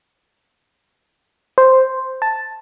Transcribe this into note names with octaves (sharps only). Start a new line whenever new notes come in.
C5
A5